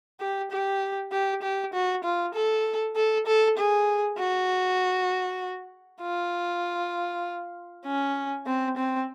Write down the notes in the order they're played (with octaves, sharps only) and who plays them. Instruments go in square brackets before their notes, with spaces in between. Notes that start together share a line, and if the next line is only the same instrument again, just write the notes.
[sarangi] G4
G4
G4
G4
F#4
F4
A4
A4
A4
G#4
F#4
F4
C#4
C4
C4